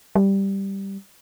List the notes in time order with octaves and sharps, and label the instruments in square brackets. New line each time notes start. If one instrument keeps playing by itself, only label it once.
[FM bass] G3